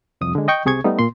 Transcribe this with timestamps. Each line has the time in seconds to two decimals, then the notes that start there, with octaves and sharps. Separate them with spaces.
0.21 C2 F2 D#6
0.35 D3 G#3
0.48 D#5 G5 C#6 G6
0.65 C2 C3 G#4 C#6 G#6
0.84 G3 A3 B3 D#4
0.99 A#2 A#3 C6